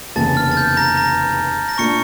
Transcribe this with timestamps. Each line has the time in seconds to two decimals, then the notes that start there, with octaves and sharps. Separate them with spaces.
0.16 F1 E2 C#3 E3 A#3 A5 A6
0.37 F6
0.51 A6
0.57 G6
0.77 A#5 A#6
0.97 A#5 A#6
1.69 A#6
1.78 A#2 A3 D4 C#6 C#7